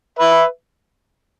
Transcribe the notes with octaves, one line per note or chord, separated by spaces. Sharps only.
B4 E5